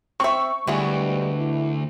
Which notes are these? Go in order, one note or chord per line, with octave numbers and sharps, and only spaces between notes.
C4 E5 C#6
D2 E3 G3 G#3 B3
E4